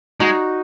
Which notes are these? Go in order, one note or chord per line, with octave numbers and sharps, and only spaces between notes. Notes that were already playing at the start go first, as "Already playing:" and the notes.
G#3 D#4 F#4